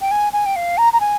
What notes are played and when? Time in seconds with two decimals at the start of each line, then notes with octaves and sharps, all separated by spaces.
0.01 G5
0.11 G#5
0.33 G#5
0.46 G5
0.56 F5
0.78 A#5
0.93 A#5
1.00 G#5